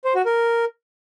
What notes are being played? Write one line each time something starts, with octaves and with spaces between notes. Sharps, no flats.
C5
F#4
A#4